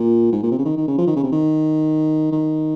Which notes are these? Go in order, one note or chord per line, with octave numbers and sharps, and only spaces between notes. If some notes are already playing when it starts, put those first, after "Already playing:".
Already playing: A#2
G#2
A#2
C3
C#3
D#3
D#3
C#3
F3
D#3
C#3
C3
D#3
D#3